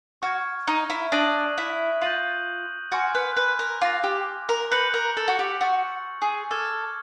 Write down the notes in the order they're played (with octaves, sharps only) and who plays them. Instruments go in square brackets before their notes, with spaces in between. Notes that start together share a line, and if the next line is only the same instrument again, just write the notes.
[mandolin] F#4 [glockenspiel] C#6 F6 G#6
[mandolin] D#4
E4
[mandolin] D4 [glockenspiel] D#6 F#6 A#6 D#7 F#7
[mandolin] E4
[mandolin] F4 [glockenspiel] G6 A#6 D#7 F#7
[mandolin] F#4 [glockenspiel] G#5 C6 F6 G#6
[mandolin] B4
B4
A#4
[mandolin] F4 [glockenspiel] D6 F#6 A#6
[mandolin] G4
A#4
[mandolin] B4 [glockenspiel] G6 A#6 C#7 F#7
[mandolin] A#4
A4
F#4
G4
[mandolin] F#4 [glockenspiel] C#6 E6 A6
[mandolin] G#4
[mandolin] A4 [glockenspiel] D6 F6 G#6